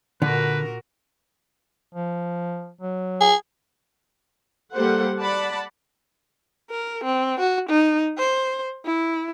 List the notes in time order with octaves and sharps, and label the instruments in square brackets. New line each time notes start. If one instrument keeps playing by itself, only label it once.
[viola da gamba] A#2 F#4 A#4 [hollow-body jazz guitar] D3 [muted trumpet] B4
[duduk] F3
F#3
[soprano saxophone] G#4
[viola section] G3 A#3 G4 A4 C5 F#5
D5 F#5 A5 B5
[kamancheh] A#4
C4
F#4
D#4
C5
E4